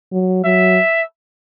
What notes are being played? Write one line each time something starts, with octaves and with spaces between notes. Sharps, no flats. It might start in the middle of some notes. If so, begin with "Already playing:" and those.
F#3
F#3 E5